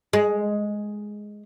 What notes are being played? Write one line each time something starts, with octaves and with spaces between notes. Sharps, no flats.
G#3